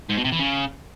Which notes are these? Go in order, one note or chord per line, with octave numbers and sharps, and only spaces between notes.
G#2
B2
C3
E3
C#3